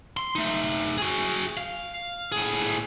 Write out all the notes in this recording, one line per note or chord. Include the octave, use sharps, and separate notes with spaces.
C6
A3 D#4
F#4 G#4
F5
A2 G#4